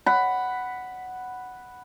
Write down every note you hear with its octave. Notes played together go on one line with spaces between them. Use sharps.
F#5 B5